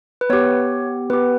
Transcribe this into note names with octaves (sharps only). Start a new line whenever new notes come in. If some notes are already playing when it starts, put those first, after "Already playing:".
B4
B3 G4 C#5
B3 G4 B4